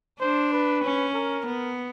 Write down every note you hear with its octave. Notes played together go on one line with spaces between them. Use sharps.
D4 C5
B4
C#4
A#4
B3